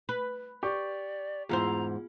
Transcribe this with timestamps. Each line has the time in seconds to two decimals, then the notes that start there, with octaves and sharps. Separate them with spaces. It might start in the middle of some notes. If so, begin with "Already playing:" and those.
0.09 B4
0.63 G4 D5 C#6
1.49 E2 G#2 B3 F4 G#4 C5 A#5